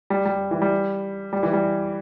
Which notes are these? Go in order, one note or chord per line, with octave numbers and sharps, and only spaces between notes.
G3
G3
E3
G3
G3
E3
G3